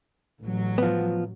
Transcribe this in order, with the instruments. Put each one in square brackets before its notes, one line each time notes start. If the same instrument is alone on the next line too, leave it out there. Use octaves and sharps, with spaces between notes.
[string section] A1 F#3
[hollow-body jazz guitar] F3 B3